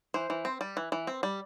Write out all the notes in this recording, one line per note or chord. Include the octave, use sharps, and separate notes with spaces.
E3 C5
E3
C4
G3
E3
E3
C4
G3